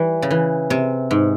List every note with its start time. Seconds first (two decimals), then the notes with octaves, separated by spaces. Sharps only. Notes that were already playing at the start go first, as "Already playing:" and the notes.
Already playing: E3 G3
0.22 C#3
0.31 E3
0.70 C3
1.11 G#2